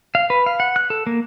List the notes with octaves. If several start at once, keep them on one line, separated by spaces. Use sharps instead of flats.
F5
B4
F5
F#5
F#6
A4
A#3